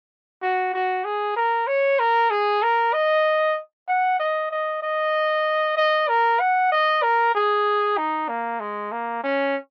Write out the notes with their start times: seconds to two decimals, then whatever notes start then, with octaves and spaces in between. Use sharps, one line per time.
0.42 F#4
0.73 F#4
1.05 G#4
1.36 A#4
1.67 C#5
1.99 A#4
2.31 G#4
2.62 A#4
2.93 D#5
3.88 F#5
4.19 D#5
4.51 D#5
4.83 D#5
5.77 D#5
6.08 A#4
6.40 F#5
6.72 D#5
7.03 A#4
7.35 G#4
7.97 D#4
8.29 A#3
8.60 G#3
8.92 A#3
9.23 C#4